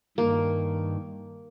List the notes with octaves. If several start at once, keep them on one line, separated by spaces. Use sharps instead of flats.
G2 D#3 A#3